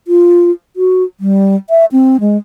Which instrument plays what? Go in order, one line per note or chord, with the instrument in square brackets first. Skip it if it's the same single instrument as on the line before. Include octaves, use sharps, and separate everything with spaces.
[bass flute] F4
F#4
G3
E5
C4
G#3